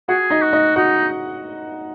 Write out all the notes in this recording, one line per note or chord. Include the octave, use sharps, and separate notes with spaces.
F#4 G#4 F#5
D#4 D#5
F#4
D#4 D#5
D#4 F#4 F#5